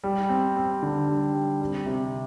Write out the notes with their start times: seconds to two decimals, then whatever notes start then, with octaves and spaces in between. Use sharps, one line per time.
0.04 G3
0.29 C4
0.57 C4
0.83 D3
1.08 G3
1.34 G3
1.61 G3
1.86 C3